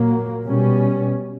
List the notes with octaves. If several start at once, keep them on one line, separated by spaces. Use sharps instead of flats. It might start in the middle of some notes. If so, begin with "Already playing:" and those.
Already playing: A#2 F#3 A#3
B2 G3 C#4